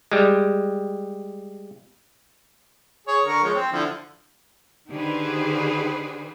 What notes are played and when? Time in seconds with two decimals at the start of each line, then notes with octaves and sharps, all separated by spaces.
0.12 G3 G#3
3.07 G#4 C#5
3.25 D3 A#4 C#6
3.43 F3 G#3 C#5
3.55 C4
3.72 D3 F3 E4
4.90 D3 D#3 G4 G#4 B4 C5